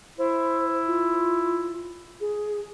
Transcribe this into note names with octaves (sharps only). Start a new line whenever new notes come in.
E4 C5
F4
G#4